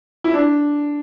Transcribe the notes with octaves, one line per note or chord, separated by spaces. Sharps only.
E4
D4